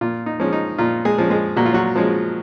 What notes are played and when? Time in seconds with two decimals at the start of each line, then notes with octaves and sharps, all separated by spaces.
0.01 A#2 F4
0.26 D#4
0.40 F3 G#3 C#4
0.53 D#4
0.78 A#2 F4
1.05 G#3 G#4
1.18 F3 G#3 C#4
1.30 G#3 G#4
1.56 A#2 F#4
1.66 F4
1.73 F#3 F#4
1.96 F3 G#3 C#4